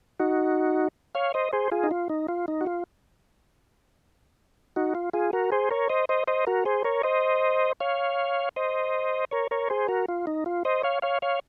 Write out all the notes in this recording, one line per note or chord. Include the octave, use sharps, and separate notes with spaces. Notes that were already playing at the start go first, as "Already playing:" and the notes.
D#4 F#4
C#5 F5
C5 D#5
G#4 C5
F4 G#4
D#4
F4
D#4
F4
D#4
F#4
F4
D#4 F#4
F4
F4 G#4
F#4 A#4
G#4 C5
A#4 C#5
C5 D#5
C5 D#5
C5 D#5
F#4 A#4
G#4 C5
A#4 C#5
C5 D#5
C#5 F5
C5 D#5
A#4 C#5
A#4 C#5
G#4 C5
F#4 A#4
F4
D#4
F4
C5 D#5
C#5 F5
C#5 F5
C#5 F5